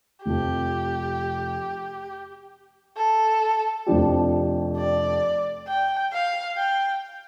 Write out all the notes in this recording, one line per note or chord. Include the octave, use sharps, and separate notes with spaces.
F1 F2 F3 G4
A4
F1 F2 F3 D4 G4
D5
G5
F5
G5